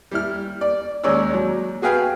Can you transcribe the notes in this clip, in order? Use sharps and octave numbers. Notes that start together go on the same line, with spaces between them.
G3 E4 F6
D5
D#2 G#3 C#4 C#5 D5 E6
F#3
F#4 G#4 B4 F5 G5 G#5